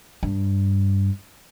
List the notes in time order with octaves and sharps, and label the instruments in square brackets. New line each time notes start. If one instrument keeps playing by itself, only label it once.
[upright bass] G2